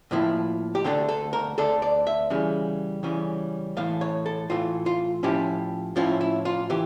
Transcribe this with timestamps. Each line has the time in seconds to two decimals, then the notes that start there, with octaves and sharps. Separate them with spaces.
0.11 A2 F3 A#3 E4
0.75 G4
0.84 D2 D3 A3 D4 A4
1.09 A4
1.33 A#4
1.58 D2 D3 A3 D4 A4
1.82 D5
2.07 E5
2.30 C#3 E3 G3 C#4
3.03 C#3 E3 G3 C#4
3.77 A2 E3 A3 F5
4.01 C#5
4.26 A4
4.50 A2 E3 A3 F4
4.86 F4
5.23 A2 F3 C#4 E4 G4
5.96 A2 F3 C#4 E4 F4
6.21 E4
6.45 F4
6.70 E3 G4